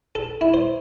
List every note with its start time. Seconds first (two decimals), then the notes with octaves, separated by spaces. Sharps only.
0.15 A4
0.41 E4
0.54 C5